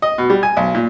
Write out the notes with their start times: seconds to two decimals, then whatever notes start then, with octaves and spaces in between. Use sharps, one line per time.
0.02 D#5
0.18 B2
0.30 G3
0.43 G#5
0.57 B1
0.75 A#2